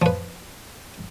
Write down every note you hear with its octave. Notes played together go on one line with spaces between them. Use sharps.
F3 B4